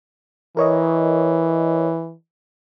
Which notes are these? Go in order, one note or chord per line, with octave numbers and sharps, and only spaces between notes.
E3 A#4 C#5 D#5